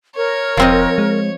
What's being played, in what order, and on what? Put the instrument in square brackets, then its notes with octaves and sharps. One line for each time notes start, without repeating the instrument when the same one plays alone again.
[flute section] A#4 [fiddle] C#5
[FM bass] E1 [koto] F3 C4 D#5
[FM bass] G#3